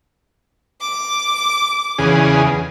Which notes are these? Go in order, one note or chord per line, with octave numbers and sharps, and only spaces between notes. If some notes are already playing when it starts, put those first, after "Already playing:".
D6
E2 C#3 G#4